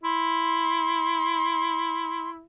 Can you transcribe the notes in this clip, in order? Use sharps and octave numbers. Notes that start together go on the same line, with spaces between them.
E4 C6